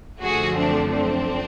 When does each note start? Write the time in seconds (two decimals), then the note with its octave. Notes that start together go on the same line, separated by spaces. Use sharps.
0.20 F#2 D3 F3 A3 F#4 G#4
0.56 C4 D4
0.93 C4 D4